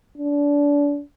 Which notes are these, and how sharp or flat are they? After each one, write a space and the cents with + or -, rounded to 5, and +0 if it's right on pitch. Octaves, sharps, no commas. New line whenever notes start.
D4 -30